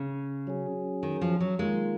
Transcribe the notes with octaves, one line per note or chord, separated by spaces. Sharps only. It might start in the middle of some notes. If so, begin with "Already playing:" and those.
Already playing: C#3
F#3 C#4 G#4
D#3
F3
F#3
D#3 G#3 A#3 F4 A#4